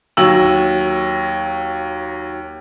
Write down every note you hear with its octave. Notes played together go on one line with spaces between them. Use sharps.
D#2 F#3 E6 F#7